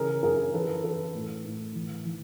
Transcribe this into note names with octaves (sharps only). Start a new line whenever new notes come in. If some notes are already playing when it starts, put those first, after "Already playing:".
Already playing: C#3 E3 G#4 A#4
F#2 G#4 A#4
E3 A4 B4
E3 A4 B4
A2
A2
E3
E3